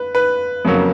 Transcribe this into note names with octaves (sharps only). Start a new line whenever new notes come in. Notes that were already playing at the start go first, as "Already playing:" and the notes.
Already playing: B4
B4
F2 C#3 F#3 A#3